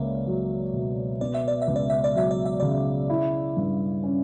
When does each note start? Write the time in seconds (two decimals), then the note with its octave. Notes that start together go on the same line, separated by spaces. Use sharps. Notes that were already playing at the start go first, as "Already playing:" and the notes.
Already playing: C#2 A#3 C#5 D5 E5
0.26 F#3
0.73 B2
1.21 B3 D5
1.34 E5
1.48 D5
1.62 E5
1.68 C#2
1.76 D5
1.90 E5
2.04 D5
2.15 F#3 E5
2.31 D5
2.45 E5
2.60 C#3 D5
3.10 E4
3.57 G2
4.03 C#4